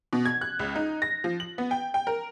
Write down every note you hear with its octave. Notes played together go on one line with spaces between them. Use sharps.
B2
G#6
F#6
C#2
D#4
A#6
F3
F#7
B3
G5
G5
A#4